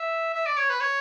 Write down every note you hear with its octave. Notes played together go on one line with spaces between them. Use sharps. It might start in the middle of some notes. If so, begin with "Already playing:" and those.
Already playing: E5
E5
D5
C#5
B4
C#5